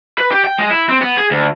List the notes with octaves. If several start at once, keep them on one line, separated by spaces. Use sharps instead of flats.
B4
G4
G5
G#3
E4
C4
B3
G#4
D2